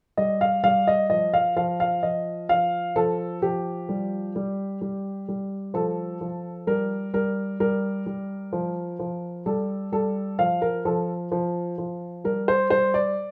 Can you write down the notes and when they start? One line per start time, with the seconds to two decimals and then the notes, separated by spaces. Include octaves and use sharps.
0.17 G3 D#5
0.41 F5
0.64 G3 F5
0.87 D#5
1.10 F3 D#5
1.34 F5
1.56 F3 F5
1.80 F5
2.03 F3 D#5
2.49 F3 F5
2.96 F3 A4
3.42 F3 G4
3.89 G3
4.36 G3
4.81 G3
5.29 G3
5.74 F3 A4
6.21 F3
6.67 G3 A#4
7.14 G3 A#4
7.60 G3 A#4
8.06 G3
8.53 F3
8.99 F3
9.46 G3 A4
9.92 G3 A4
10.39 F3 F5
10.62 A#4
10.85 F3 A4
11.32 F3
11.78 F3
12.24 G3 A#4
12.48 C5
12.70 G3 C5
12.94 D5